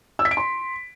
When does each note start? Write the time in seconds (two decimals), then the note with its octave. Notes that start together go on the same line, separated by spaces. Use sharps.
0.19 E6
0.25 B6
0.31 D7
0.37 C6